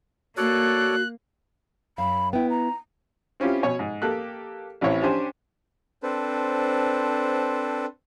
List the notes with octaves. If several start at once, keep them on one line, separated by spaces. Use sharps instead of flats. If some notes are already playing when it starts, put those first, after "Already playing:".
A#3 F#4 A4 C#5 D5 F#6
F#2 F5 B5
B3 E4 G5
A#5
C4 C#4 E4 F4 G4
B2 C#5 G#5
G#2
A#3 G4 A4 F#6
A1 E3 C4 C#5 E5
C#4 D4 G4 C5 G#5
C4 D4 A4 B4 C5